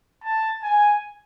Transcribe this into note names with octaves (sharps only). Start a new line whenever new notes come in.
A5
G#5